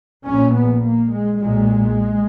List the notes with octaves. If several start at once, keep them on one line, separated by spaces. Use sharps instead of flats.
A#1 A#2 C#4
B3
A#3
G#3
B1 A#2 G#3